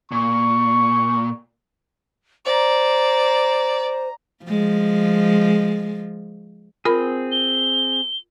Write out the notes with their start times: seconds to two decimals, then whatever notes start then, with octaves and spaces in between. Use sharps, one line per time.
0.12 A#2 C#6
2.45 C5 D5 A#5
4.45 F3 G#3
6.85 C4 F4 G#4 A#4 B5
7.32 G7